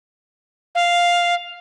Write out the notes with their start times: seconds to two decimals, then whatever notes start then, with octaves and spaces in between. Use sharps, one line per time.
0.75 F5